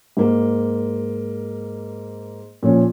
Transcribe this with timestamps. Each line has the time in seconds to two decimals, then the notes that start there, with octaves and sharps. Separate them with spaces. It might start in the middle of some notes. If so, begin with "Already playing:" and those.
0.17 G#2 A#3
2.63 A#2 F3 C#4